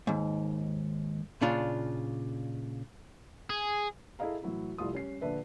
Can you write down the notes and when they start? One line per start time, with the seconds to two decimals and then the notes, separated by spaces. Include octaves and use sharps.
0.07 D#2 G#2
1.41 A#2 C#3 D4 F4
3.50 G#4
4.19 E4 G#4 A4 D#5 F5 A#5
4.43 A2 E3 F#3 E4
4.78 F1 C2 E4 F4 D#6
4.93 G3 C#4 C7
5.21 A#1 D3 D4 B4 E5